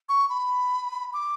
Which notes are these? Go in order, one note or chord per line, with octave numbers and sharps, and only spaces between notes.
C#6
B5
D6